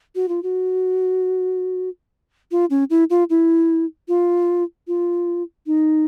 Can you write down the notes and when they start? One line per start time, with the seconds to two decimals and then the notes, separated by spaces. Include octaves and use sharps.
0.15 F#4
0.29 F4
0.43 F#4
2.51 F4
2.70 C#4
2.90 E4
3.10 F4
3.30 E4
4.08 F4
4.88 F4
5.67 D#4